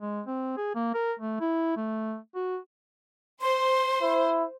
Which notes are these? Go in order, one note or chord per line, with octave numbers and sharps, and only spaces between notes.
G#3
C4
G#4
A#3
A#4
A3
E4
A3
F#4
C5 C6
E4